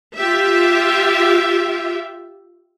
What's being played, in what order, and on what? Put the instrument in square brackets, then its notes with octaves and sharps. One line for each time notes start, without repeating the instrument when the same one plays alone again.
[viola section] F4 G4 E5